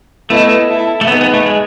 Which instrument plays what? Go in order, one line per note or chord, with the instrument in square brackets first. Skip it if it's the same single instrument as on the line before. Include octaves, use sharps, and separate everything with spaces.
[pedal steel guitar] A3 [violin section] B3 E4 A4 D#5 A5
[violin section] E4 A4 E5
[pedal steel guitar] A3
[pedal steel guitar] B3 [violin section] D#4 G#4 B4 D#5
[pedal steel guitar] B3
A3
G#3